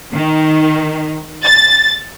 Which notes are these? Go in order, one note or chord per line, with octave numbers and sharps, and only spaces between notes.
D#3
A6